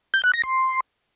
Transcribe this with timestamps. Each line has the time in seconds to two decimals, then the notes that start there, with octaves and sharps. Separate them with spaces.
0.14 G6
0.24 F#6
0.34 A#6
0.44 C6